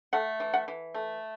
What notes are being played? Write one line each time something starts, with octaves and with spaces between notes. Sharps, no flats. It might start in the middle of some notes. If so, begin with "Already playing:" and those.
A3 F#5
E3
F#5
E3
A3